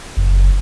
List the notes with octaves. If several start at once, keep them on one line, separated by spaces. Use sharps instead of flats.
F#1